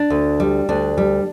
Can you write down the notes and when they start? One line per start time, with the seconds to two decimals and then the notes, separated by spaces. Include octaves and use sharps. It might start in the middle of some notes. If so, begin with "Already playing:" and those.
Already playing: D4
0.10 D2
0.40 G3
0.69 D2 D4
0.98 G3